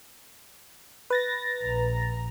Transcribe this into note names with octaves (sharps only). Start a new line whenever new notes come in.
B4 A6 A#6
A#1 A#5